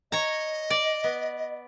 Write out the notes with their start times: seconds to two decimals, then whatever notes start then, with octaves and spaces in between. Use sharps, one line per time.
0.12 C#5 D#5 A#5
0.70 D5
1.04 B3